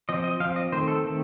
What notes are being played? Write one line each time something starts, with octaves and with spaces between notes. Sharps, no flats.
F3 C4 D#5
D#5
F3 C4 F5
D#5
D#3 A3 C4 C5
A4
D#3 A3 C4